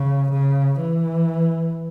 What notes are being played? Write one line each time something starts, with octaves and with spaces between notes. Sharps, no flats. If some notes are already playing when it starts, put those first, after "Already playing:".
Already playing: C#3
C#3
E3